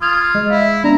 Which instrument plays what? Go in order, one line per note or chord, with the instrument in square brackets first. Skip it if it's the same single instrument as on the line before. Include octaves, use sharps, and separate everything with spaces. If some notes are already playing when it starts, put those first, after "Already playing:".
[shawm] F4 [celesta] D#6 G#6 F7
[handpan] G#3 [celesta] D#5
[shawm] E4 [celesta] E5 F5
[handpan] B3 D4 [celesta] D5 [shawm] A#5